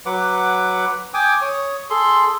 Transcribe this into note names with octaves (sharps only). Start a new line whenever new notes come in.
F#3 B4 F#5 D6
G5 G#5 D6 D#6
C#5 D#6
G#4 A4 C6